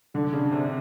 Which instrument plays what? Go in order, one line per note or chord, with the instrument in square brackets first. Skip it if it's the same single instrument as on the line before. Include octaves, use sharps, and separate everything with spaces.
[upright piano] D3 [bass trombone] D4
[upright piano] C#3
C3